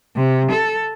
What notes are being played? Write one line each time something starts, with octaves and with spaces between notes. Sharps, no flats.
C3
A4